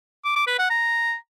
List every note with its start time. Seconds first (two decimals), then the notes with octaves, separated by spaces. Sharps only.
0.25 D6
0.36 D6
0.47 B4
0.59 F#5
0.70 A#5